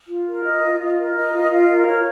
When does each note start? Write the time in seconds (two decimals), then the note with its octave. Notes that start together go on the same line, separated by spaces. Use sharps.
0.08 F4
0.26 A#4
0.44 D#5
0.61 F4
0.79 F4
0.97 A#4
1.14 D#5
1.32 F4
1.50 F4
1.68 A#4
1.86 C#5